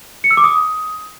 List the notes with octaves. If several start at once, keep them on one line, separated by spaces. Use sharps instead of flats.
C#7
E6
D6
D#6